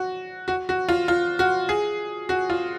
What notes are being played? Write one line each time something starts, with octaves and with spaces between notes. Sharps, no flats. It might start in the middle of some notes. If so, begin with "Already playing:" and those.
Already playing: F#4
F#4
F#4
F4
F4
F#4
G#4
F#4
F4